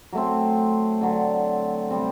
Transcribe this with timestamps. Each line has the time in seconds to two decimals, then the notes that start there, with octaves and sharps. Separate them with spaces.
0.13 F#3 A3 C4
1.01 D3 F#3 A3
1.90 C3 G3 C4